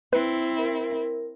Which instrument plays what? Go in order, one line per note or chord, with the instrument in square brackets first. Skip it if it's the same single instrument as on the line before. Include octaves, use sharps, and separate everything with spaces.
[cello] C4 E4 [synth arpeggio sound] B4
[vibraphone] A#4